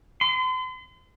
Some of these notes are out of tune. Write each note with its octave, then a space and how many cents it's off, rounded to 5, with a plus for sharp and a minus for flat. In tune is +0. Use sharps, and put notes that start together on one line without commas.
C6 -40